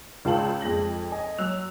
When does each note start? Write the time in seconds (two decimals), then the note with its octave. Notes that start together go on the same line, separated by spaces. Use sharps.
0.25 C#2 F4 F5 A5 F#7
0.61 F2 G#3 A#6 F#7
1.12 D#5 G#5
1.38 F#3 E6 F#6 F7